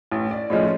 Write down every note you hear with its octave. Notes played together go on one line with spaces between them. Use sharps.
A1
D5
A2 F3 G#3 C#4 C#5 D#5